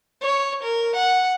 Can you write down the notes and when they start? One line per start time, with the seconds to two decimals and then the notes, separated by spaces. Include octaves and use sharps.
0.22 C#5
0.64 A#4
0.96 F#5